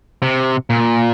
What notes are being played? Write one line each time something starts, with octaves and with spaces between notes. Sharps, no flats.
C3
A#2